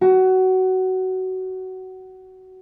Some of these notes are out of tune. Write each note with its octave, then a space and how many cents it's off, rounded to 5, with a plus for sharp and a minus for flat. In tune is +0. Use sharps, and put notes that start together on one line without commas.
F#4 +20